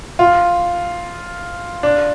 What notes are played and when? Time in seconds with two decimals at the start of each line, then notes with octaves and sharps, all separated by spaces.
0.19 F4
1.83 D4